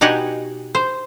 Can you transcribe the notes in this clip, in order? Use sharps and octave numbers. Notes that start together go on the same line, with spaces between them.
B2 D#4 G4 F#5 G#5
C5